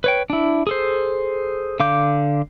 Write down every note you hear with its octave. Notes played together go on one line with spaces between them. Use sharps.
B4 C#5 G5
D4 E4
G#4 A4 C5
D3 F5 D6 G6